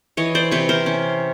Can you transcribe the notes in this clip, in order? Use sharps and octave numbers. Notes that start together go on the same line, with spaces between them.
E3 C#5 D#5
C5 D5
C3 B4 C#5
A#4 C5
C#4